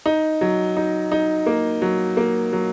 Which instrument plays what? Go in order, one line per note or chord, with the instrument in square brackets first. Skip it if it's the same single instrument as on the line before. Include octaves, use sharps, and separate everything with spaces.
[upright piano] D#4
F#3
D#4
D#4
A#3
F#3
A#3
F#3